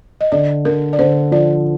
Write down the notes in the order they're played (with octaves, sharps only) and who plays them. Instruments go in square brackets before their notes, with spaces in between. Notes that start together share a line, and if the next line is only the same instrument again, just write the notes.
[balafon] D#5
[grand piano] D3 [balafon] D5
[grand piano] D3 [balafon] A#4
[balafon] D5
[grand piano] D3 [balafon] C5
[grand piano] F3 [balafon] D5